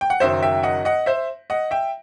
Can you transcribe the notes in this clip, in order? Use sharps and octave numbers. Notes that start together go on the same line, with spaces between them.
G5
F#5
F#1 F#2 D#3 F#3 C5 E5
E5 G5
D#5 F#5
D#5 F#5
C5 E5
D#5 F#5
E5 G5